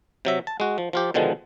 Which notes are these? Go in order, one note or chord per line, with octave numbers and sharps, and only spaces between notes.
C3 F#3 E5
A5
G#3 F#4
F3
F3 F4 G4
B2 D3 D#3 F3 G#3